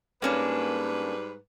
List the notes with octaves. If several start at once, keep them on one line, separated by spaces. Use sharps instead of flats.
G#2 G3 A#3 C#4 D4 B4